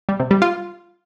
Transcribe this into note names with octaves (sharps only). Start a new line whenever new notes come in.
G3
C3
G3
F4